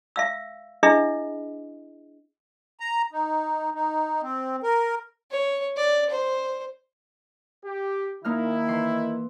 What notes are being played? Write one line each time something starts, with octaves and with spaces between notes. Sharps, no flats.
E5 F5 E6
D4 E4 G#4 D#5 E5
A#5
D#4
D#4
C4
A#4
C#5
D5
C5
G4
D#3 A#3 D#4 E4 F6
E3 C6